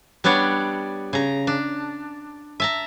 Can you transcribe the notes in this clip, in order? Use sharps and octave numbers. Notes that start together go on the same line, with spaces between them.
G3 B3 D4 C#5 D5 F#5
C#3 A#5
D4
E5 A5 A#5